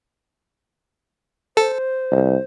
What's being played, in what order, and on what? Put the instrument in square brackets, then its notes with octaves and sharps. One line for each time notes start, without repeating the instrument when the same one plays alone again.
[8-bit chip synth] A4 [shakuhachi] C5
[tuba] C2